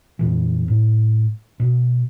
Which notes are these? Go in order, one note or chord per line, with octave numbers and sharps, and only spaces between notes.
F2 A#2 E3
A2
B2